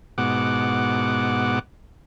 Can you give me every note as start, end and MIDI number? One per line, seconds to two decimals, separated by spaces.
0.18 1.59 44
0.18 1.59 47
0.18 1.59 78
0.18 1.59 86